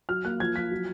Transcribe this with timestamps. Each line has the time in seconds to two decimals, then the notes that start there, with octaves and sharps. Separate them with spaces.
0.09 F#3 F6
0.25 A#3 F#6
0.40 F3 G#6
0.56 F3 B6
0.71 F#3